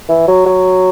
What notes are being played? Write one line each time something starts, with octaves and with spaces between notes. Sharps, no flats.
E3
F#3
F#3